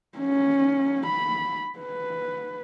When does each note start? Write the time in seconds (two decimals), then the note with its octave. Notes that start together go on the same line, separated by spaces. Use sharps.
0.18 C#4
1.07 B5
1.79 B4